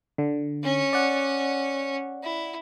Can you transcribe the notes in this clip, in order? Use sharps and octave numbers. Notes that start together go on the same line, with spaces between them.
D3
C#4 C#5
D5 F#5
E4